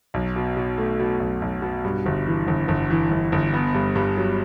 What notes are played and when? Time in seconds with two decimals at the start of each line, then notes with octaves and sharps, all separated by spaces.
0.14 B1
0.36 B2
0.57 B2
0.78 A3
0.99 B2
1.20 B1
1.42 B1
1.62 B2
1.84 G2
2.06 G1
2.27 E3
2.47 G1
2.68 G1
2.90 E3
3.11 G1
3.32 G1
3.54 B3
3.74 G2
3.96 G2
4.17 F#3